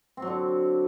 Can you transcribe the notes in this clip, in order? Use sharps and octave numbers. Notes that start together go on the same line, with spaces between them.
D3 F#3 C4